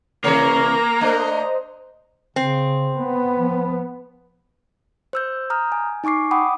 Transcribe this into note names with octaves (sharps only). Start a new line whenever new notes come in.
C3 E3 A#3 C#5 A#5
A3 D4 C5 D#5
C#3 C4
B3
F3
C5 E6 G6
A#5 D#6 F6 G6
G#5
D#4 G#5 C#6 D6 C7
F#5 G5 B5 D6 D#6